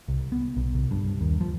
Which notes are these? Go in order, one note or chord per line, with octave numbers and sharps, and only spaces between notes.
C2
B3
B1
C2
G2
D#2
F3